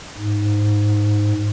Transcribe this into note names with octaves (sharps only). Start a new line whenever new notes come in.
G#2